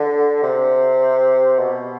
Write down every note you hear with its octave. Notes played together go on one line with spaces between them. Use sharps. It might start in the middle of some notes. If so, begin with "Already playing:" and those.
Already playing: D3
C3
B2